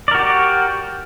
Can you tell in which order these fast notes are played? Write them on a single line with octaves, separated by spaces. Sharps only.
D5 A#4 F#4 G4